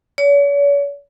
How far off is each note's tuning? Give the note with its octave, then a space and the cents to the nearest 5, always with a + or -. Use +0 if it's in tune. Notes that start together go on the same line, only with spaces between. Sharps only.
C#5 +45